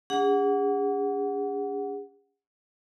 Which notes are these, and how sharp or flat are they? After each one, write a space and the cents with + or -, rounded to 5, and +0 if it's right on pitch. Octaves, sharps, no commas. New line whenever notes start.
D4 -45 G#4 -35 F#5 +0